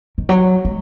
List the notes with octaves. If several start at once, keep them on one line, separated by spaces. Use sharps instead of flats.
D#3
F#3
G#3